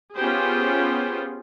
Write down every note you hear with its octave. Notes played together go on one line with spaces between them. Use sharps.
B3 C#4 F4 G4 G#4 C5